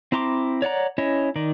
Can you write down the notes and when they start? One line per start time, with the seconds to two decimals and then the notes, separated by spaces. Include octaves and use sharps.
0.12 C4 E4 A#5 C6 D6
0.62 C#5 D5 F#5 A#5
0.98 C#4 E4 C#5 D#5
1.36 D#3 D#4 D5